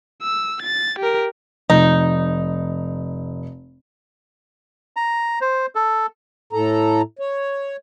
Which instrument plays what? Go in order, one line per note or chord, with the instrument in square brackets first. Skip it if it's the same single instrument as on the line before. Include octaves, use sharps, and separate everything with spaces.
[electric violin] E6
A6
G4 A#4
[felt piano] F1 [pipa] D#4
[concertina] A#5
C5
A4
[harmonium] A2 A4 A#5
C#5